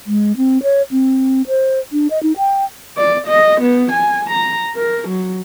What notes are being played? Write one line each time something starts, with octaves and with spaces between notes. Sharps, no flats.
G#3
C4
C#5
C4
C5
D4
D#5
D#4
G5
D5
D#5
B3
G#5
A#5
A#4
F#3